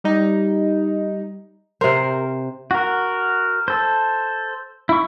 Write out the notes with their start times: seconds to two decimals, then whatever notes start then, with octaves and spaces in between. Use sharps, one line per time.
0.04 G3 D#4
1.81 C3 A#4 C5
2.71 F#4 A#4
3.68 A4 C5
4.89 E4 C#6